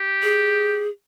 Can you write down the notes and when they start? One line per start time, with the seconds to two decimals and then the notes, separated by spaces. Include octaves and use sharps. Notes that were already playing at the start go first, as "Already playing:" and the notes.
Already playing: G4
0.23 G#4